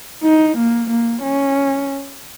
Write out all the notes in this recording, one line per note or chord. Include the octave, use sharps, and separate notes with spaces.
D#4
A#3
A#3
C#4